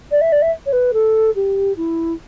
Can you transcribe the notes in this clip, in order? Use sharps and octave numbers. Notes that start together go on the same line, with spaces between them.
D5
E5
D5
E5
C#5
B4
A4
G4
E4